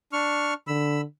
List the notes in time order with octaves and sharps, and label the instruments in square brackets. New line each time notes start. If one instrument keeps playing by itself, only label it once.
[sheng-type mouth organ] D4 C#6 F6
[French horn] D3 [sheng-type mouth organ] B5 E6